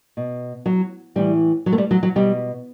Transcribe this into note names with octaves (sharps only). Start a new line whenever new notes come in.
B2
F#3
A2 E3 G3
F#3
A3
G3
F#3
F#3
B2 G3